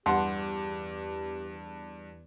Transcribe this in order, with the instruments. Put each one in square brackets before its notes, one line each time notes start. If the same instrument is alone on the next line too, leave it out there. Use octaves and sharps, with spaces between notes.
[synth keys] E2 [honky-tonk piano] G2 [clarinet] G4 [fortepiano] F#5 A5 C6